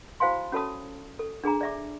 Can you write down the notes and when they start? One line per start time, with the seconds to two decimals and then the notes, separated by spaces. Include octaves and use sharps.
0.20 E4 F#4 C5 F5 G#5 C6
0.52 C#4 F#4 A4 C#5 A5 D#6
1.19 A4
1.44 D4 G#4 G#5 A#5
1.61 D5 E5 D6